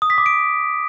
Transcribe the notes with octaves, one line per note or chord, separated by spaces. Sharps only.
D#6
B6
D6
D7